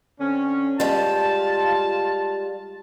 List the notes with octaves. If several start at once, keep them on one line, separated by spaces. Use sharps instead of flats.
D3 C4 C#4
G3 G#3 F4 A5